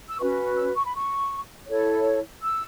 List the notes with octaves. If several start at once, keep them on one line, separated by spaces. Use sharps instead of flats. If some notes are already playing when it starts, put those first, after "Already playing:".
E6
C#4 F#4 B4 C#6
E6
C#6
B5
C#6
E4 A4 C#5
E6